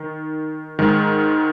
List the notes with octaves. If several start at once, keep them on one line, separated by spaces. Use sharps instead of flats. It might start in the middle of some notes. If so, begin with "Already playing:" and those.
Already playing: D#3
G#2 D#3 G#3